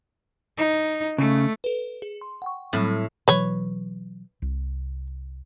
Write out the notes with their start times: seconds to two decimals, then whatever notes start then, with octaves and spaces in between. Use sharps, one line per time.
0.57 D#4
1.18 C#3 A3
1.64 A4 B4
2.02 G#4
2.21 C6
2.42 F#5 G5 C#6
2.73 A2 F#3 G3 C4
3.28 B2 E3 F#3 B4 C#5
4.42 C2